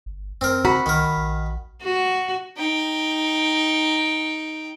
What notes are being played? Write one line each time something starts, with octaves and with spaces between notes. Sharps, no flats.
G1
F#2 C4 A#4
C#3 F#4 B5
C2 D#3 A#4
A#1
F#4
D#4 G5